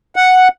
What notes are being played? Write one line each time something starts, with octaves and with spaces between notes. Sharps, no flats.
F#5